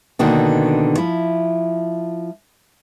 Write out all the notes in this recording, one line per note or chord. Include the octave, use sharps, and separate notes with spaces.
B2 D3 D#3 A#3 F#4
F3 E4